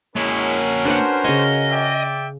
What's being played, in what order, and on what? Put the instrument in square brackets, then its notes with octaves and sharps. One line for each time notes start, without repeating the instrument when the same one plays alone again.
[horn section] G#3 E4 [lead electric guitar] A#3 C#5 [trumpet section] C#4 F#4 A#4
[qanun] D4 B4 F#5 [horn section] C5
[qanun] C#3 C#5 [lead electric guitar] D#5
[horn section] D5 E5 G5